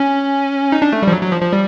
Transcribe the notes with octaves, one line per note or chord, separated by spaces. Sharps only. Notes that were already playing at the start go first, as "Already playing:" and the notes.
Already playing: C#4
D#4
D4
A3
F3 G3
F#3
F#3
F3
F3
G3